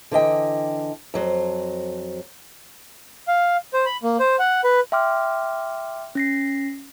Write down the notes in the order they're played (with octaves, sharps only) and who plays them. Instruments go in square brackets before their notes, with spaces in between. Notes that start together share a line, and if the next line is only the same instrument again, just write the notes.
[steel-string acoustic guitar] D3 E3 D#5 G5
F2 F#3 C5
[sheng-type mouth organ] F5
C5
B5
A#3
C5
F#5
B4
[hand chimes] E5 G5 C6 D6 F6
C#4 A#6 C7